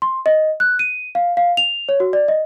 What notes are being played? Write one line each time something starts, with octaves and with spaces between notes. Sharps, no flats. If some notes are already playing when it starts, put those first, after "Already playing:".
C6
D#5
F#6
D#7
F5
F5
F7
C#5
F#4
D5
D#5